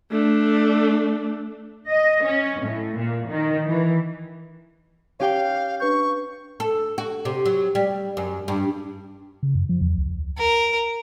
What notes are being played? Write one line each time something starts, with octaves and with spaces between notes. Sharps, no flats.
A3 D4
D#5
C#4
A2
A#2
D#3
E3
C#4 G4 C#5 F5 G5
D4 B4 C#6 G6
A4
F#4
C3
F#3
G3
F#2
G2
C#3
F#2
F3
E2
C#2
A#4